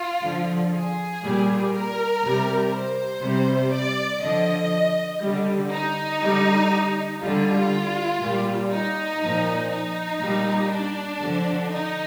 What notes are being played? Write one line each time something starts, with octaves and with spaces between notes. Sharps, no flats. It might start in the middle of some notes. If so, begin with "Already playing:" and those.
Already playing: F4
D3 F3
G#4
A#2 G3
A#4
C3 G3
C5
C3 G3
D5
D3 F3 D#5
D3 G3
D#4
D3 G3
D3 G3 F4
A#2 G3
D#4
A#2 F3
D#4
A#2 G3
D4
D3 F3
D#4